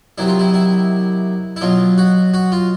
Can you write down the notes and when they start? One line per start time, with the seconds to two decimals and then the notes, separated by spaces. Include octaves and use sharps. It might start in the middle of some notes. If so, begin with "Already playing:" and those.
0.18 C3 D#3 F#3 E4
0.28 F4
0.39 E4
0.54 E4
1.56 E4
1.61 B2 F#3 F4
1.98 F#4
2.34 F#4
2.52 F4